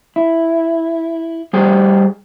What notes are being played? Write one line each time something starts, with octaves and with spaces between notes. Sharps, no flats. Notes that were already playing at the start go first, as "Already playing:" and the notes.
E4
G3 G4 G#4 C5 G5